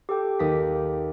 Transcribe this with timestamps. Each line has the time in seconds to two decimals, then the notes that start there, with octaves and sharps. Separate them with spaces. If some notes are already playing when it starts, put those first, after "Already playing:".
0.09 G4 A4 G5
0.39 D#2 D#6 B6